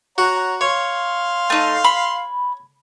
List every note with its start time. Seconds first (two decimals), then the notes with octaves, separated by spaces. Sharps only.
0.18 F#4 C#5 F#5 A#5
0.61 C#5 F5 C6
1.50 A3 D#4
1.84 B5